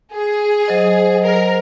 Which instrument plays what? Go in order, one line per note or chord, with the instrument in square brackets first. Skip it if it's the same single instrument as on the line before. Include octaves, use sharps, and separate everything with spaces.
[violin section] G#4
[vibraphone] F#3 C5 D#5
[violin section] A#4